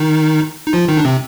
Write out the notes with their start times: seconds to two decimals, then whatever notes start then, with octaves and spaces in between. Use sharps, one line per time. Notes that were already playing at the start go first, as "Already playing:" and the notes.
Already playing: D#3 D#4
0.67 D#4
0.73 F3 F4
0.88 D#3 D#4
0.97 D4
1.05 C3 C4